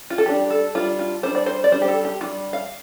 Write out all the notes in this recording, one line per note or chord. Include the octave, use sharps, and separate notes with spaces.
F4
A4
G3 D4 G4
A4
G3 D4 F4
F4
G3 D4 C5
D5
C5
D5
G3 D4 C5
G4
A4
G4
G3 D4 F4
F5